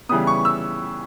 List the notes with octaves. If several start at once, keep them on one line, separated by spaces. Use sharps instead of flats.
C#3 E3 G3 B3 D#6
C#6
E6